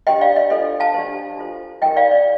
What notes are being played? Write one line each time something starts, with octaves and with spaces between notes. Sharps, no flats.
D4 G4 C5 D#5 G5
D5 F5
D#5
D4 F4 A4 C5 D#5
F5 A5
D4 G4 C5
F4 A4 C5
D#4 G4 A#4 D#5 G5
D5 F5
D5